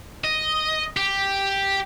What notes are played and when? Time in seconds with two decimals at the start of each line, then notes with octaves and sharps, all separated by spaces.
0.24 D#5
0.96 G4